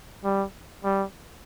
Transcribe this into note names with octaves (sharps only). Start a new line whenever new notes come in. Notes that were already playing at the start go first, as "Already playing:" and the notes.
G3
G3